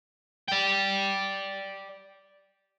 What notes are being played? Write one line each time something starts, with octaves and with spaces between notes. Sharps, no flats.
D5 G5